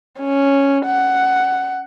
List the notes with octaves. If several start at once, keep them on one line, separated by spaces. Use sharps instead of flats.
C#4
F#5